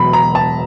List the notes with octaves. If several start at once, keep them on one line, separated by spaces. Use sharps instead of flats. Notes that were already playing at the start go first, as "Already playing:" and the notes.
Already playing: E1 E2 B2 F#3 B5
A#5
A5